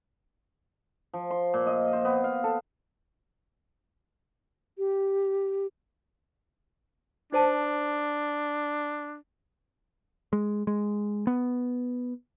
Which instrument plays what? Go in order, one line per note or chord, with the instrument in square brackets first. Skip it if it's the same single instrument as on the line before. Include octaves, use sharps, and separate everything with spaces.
[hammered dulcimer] F3
C6
A#2
D#5
C5
B3
F5
A4
[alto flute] G4
[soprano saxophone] D4 [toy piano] D#4 C5 A5
[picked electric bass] G#3
G#3
B3